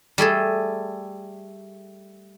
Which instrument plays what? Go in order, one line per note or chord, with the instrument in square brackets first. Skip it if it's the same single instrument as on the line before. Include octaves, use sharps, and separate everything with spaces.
[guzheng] G3 A3 G#4 A4